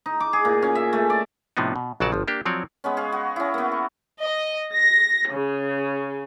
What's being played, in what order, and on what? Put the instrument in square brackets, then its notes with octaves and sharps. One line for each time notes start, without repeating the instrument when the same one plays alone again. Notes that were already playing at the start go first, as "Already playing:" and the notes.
[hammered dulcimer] D#4
D6
G#4
A#2
C#4
E5
A3
D5
[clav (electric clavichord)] A2 C3 F3 B3 D4 D#4
B2
A#1 C#3 F#3 F#4 D5 A5
G1 F3
A#3 D4 G4
F3 F#3 C4 C#5 D5
[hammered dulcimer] G#3 B3 C#4
G#4 F5
F#4
C#4 E4
A#3 B3
C#6
[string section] D#5
A#6
C#3